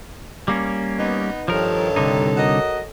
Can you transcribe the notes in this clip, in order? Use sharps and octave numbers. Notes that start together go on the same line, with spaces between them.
G3 A#3 C#4
B3 D#4
G2 D#3 F3 A4 A#4 C#5
C2 D3 D#4
F#4 A#4 D#5